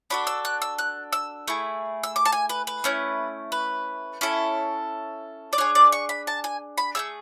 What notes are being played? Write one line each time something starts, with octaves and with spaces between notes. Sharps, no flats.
D4 F#4 A4 B5
E6
F#6
E6
F#6
E6
A3 E4 G#4
E6
D6
A5
G#5
B4
B4
A3 C#4 E4
B4
C#4 E4 A4
D5
D4 G#4 C#5
D5
C#6
B5
A5
G#5
B5
A3 E4 G#4 E6